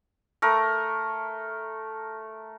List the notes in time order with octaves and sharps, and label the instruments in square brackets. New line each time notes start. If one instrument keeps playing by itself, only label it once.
[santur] A3 A#4